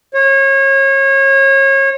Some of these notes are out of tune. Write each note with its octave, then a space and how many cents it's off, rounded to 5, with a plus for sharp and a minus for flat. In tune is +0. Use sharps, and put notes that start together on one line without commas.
C#5 -30